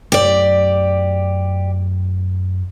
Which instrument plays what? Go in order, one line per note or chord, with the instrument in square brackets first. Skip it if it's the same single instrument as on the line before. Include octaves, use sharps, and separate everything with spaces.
[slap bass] F#2 A3 [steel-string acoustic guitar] G4 D5